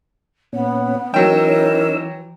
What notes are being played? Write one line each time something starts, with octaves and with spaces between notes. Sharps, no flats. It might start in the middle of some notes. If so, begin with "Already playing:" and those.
A#2 B3 C#4
E3 F#3 C#4 D#4 A#4 G5 E6